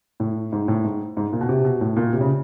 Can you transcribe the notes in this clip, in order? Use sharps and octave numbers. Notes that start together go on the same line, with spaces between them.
A2
G#2
A2
G#2
G#2
A#2
B2
C3
B2
A2
A#2
C3
C#3